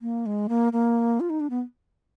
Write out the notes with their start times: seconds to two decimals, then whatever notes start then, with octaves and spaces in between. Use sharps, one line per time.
0.02 A#3
0.26 G#3
0.49 A#3
0.73 A#3
1.20 F4
1.30 D#4
1.40 D4
1.50 B3